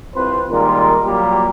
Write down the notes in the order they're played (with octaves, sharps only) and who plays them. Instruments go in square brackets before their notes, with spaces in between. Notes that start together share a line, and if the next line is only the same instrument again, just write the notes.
[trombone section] C2 C4 F4 B4 C5
A#2 D#3 G3 G#3 F4 A#4
A#2 F#3 G3 A#3 G4 A#4